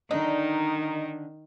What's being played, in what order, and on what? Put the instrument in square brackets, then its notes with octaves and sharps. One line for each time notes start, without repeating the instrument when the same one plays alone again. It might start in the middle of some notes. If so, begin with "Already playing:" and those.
[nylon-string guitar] D3 D4 [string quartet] D#3 [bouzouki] D#4